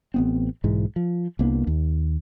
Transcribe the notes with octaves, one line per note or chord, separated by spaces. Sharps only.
A1 B3 C4
B1 G#2 E3
F3
C2 A#3 B3 D4
D#2